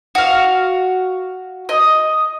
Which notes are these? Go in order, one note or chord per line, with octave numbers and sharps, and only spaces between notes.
F#4 F5
D#5